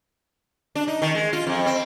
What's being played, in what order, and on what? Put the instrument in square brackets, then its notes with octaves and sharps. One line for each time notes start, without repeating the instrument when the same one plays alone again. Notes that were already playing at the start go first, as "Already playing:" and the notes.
[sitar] D4
D#4
D#3
G#3
F4
F2
C4